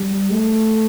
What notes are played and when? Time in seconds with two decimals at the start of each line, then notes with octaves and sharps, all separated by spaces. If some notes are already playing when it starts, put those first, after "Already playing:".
Already playing: G3
0.31 A3